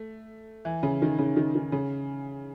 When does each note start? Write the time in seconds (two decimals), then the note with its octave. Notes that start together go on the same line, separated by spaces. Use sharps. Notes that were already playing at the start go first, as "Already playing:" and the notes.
Already playing: A3
0.65 E3
0.83 C#3
1.02 D#3
1.18 C#3
1.36 D#3
1.55 D#3
1.72 C#3